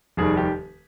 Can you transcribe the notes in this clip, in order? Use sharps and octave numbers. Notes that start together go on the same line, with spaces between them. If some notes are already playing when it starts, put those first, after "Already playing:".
F1 D#2 D#3 G3 G#4
G4